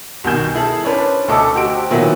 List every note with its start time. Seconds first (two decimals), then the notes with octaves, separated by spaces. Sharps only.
0.24 C2 B2 D#3 G#5 G6 E7
0.54 E4 G#4 A4
0.85 C#4 D4 B4 C5
1.28 D2 A3 A4 D#5 D6 E6
1.55 F#4 G4 C5 E6 D7
1.90 A#2 D#3 F#3 B3 E4